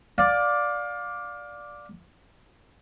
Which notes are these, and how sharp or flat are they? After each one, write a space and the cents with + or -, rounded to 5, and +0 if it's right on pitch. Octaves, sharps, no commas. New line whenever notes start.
D5 +0 F5 +25